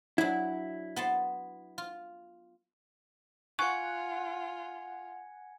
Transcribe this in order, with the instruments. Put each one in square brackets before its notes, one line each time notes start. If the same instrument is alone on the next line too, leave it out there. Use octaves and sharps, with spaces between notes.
[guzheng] F#3 D4 [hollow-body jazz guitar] E4
[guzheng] B3 A5 C6
F4
[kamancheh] F4 [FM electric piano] F#5 [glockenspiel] G#5 G#6 C#7 [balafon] C#6